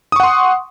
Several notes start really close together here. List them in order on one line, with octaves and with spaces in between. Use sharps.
D#6 C#6 F#5 C6